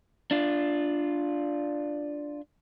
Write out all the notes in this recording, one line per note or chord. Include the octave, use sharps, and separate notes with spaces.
D4 F4